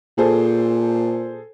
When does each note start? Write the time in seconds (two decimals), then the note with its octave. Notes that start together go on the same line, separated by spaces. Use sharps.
0.18 A#2 G#4 A4 C5